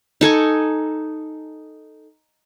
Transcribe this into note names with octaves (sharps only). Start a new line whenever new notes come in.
D#4 A4 G#5 C#6